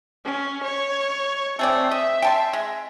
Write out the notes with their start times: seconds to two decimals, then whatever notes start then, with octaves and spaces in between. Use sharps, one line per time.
0.25 C#4
0.64 C#5
1.59 A3 C4 G#4 D5
1.91 D#5 E5
2.22 G5 A5 C6
2.53 G#3